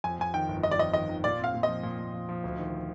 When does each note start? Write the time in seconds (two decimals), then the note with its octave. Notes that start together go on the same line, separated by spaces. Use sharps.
0.04 F2 G#5
0.19 F2 G#5
0.34 D#3 G5
0.48 G1
0.63 D#3 D#5
0.71 D5
0.79 F2 D#5
0.93 D#3 D#5
1.09 D#3
1.24 A#2 D5
1.39 C4 F5
1.54 A#2
1.63 D#5
1.68 F3
1.83 A#2
1.99 A#2
2.14 F3
2.29 F3
2.44 D2
2.59 D#3